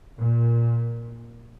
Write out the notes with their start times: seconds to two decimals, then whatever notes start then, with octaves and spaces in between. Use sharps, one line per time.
0.18 A#2